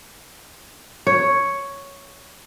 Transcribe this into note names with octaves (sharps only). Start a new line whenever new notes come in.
C#5